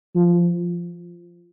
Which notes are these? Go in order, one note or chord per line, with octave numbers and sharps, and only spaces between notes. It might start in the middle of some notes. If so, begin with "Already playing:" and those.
F3